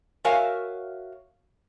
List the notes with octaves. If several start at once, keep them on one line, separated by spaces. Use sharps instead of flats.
F#4 A#4 C#5 E5 F5 G#5